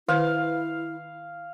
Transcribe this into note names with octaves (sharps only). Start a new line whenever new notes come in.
D#3 E4 B4 C5 F5